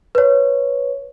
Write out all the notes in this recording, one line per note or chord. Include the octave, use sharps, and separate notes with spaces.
B4 C#5